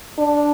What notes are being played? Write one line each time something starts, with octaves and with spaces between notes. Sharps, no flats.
D4